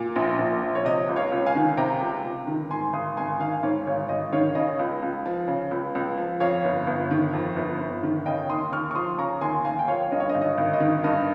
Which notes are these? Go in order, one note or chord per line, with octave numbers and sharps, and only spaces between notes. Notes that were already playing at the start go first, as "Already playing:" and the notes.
Already playing: A#2
A#1
A#1
F3
C#5
C3 D#5
C#2
C#5 F5
C#2
F5 G#5
D#3
C3 G5 A#5
C#2
C#2
D#3
G#2 G#5 C6
G#1 C6 D#6
G#1 G#5 C6
D#3 F5 G#5
G#2 C#5 F5
G#1 C#5
G#1 D#5
D#3 C#5 F5
C#3 D#5
C#2
C#2
F3
C#3
C#2
C#2
F3
F2 C#5 F5
G1
G1
D#3
F2
G1
G1
D#3
C#3 D#5 G5
D#2 C6 D#6
D#2 C#6 F6
C#6
F3 C6 D#6
C#3 A#5 C#6
D#2 G#5 C6
D#2 F5 G#5
G5
F3 C#5 F5
G2 D#5
C#5
D#5
G#1
D#5
G#1
D#5
D#3
G2 D#5